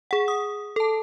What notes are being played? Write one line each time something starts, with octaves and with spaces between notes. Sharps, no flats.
G#4 F#5
D#6
A4 A5